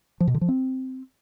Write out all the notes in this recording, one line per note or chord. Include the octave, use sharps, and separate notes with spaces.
F3
B2
D3
F3
C4